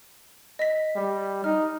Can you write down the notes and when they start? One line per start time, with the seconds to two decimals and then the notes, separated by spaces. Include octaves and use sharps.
0.59 D#5 B6
0.96 G3
1.44 D#4 F6